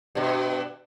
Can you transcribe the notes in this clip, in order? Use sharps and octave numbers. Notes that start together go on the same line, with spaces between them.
G2 B2